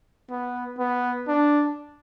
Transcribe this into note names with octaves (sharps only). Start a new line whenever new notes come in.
B3
B3
D4